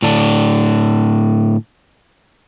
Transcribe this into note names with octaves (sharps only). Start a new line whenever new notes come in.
A2 D3 D4